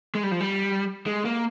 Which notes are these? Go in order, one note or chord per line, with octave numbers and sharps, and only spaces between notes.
G#3
G3
F3
G3
G#3
A#3